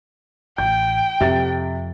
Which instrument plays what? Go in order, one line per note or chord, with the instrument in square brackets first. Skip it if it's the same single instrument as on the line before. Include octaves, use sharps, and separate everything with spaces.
[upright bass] A1 [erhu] G5 [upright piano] G6
[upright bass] F2 [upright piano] C3 A6